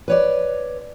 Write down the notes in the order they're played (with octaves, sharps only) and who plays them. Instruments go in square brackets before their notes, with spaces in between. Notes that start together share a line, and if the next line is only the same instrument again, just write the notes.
[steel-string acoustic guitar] B4 C#5 D5